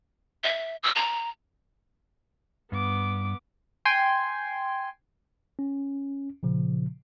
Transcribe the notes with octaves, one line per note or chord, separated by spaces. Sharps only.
E5
E6
A#5
G2 B3 D6
G5 G#5 C6
C#4
A#2 C#3 F3